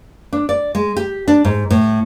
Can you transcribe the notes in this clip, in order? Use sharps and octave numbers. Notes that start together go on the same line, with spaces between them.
D4
D5
G#3
G4
D4
G#2
A2